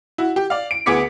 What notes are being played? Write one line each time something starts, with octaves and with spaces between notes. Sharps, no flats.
E4 F#4
G4
D5 F5
D7
D2 B3 G#4 D6 B6 C#7